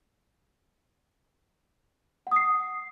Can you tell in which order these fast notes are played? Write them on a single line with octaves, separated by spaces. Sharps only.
F#5 D#6 C7